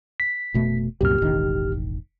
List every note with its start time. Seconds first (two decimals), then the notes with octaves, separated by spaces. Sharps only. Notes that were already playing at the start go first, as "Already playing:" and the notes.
0.20 B6
0.54 F1 B2 A3
1.01 C2 F#2 A#2 G4 F6
1.22 E1 A1 D#3